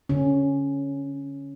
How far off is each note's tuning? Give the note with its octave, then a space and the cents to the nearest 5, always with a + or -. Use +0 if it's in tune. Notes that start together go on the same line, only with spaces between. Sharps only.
D3 -30 C#4 +0